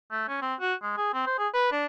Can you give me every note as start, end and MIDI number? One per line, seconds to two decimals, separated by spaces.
0.12 0.25 57
0.28 0.39 61
0.42 0.54 60
0.60 0.74 66
0.83 0.93 56
0.97 1.12 68
1.14 1.23 60
1.27 1.35 72
1.38 1.48 68
1.54 1.70 71
1.72 1.86 62